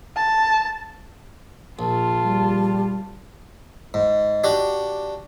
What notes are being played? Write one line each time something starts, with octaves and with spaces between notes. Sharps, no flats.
A5
A#1 F4 A5
G3
G#2
D4 F#4 G4